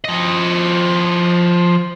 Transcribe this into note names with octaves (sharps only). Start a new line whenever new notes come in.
F3 D#5